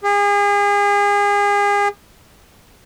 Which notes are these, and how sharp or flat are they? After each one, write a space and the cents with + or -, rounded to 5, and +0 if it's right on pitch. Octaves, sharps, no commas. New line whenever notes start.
G#4 -35